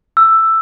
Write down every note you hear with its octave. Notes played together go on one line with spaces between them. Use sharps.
E6